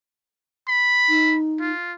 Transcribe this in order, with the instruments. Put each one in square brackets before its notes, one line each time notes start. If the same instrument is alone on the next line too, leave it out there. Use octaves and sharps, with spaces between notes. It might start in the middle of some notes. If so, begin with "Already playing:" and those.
[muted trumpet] B5
[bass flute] D#4
[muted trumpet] F4